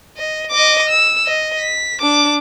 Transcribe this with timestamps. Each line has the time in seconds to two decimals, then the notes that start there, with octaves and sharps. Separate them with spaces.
0.17 D#5
0.51 D#5 D6
0.89 E6
1.26 D#5
1.59 B6
2.02 D4 D6